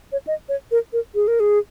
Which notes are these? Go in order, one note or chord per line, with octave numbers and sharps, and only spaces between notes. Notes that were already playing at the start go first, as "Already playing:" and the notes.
C#5
D#5
C#5
A#4
A#4
G#4
A#4
G#4